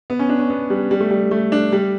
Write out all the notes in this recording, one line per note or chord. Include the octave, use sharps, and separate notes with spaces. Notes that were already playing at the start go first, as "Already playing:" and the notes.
B3
C#4
D4
C#4
B3
G3
G3
A3
G3
A3
D4
G3